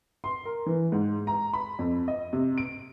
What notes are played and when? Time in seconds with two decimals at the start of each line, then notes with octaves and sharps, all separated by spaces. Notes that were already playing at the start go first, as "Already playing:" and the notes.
0.24 C6
0.45 A#4
0.66 E3
0.92 G#2
1.27 A#5
1.53 B5
1.79 F2
2.08 D#5
2.33 C3
2.58 D7